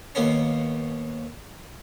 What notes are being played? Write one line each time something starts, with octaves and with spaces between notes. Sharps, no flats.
D#2 A#3 B3 C#4